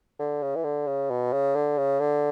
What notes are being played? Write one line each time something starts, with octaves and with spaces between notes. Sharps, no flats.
D3
C#3
E3
D3
C#3
B2
C#3
D3
C#3
D3